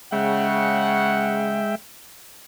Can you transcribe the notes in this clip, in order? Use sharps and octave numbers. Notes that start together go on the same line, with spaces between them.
C#3 G#3 E5 F#5 G5